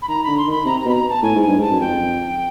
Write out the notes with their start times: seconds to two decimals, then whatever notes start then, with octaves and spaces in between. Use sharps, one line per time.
0.02 B5
0.08 D#3 A#5
0.23 D3 B5
0.37 C6
0.47 D#3 B5
0.65 C3 A#5
0.80 A#5
0.86 B2 B5
0.94 A#5
1.09 A5
1.23 A2 G#5
1.35 G#2
1.42 G2 G#5
1.59 G#2 A5
1.71 F#2
1.80 F2 G5